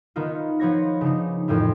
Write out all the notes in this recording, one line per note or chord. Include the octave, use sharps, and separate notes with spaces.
D#3 B3 D#4 F4
F3 B3 C#5 A#6
C#3 D4 D#4
F2 A2 D#3 E3